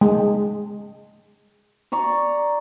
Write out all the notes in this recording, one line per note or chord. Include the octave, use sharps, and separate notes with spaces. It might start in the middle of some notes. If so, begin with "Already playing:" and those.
G#3
D5 A#5 C#6